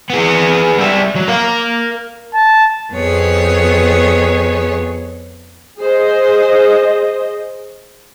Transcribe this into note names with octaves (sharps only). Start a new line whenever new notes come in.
B3 G#4
G3 E5
F#3
A#4 F5
A5
F2 B3 G#4 C#5
G#4 C5 D#5